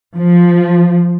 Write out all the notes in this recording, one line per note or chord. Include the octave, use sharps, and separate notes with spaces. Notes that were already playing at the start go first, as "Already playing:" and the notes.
F3